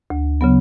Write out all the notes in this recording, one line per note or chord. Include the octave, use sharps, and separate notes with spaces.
D2
C#3 F#3 B3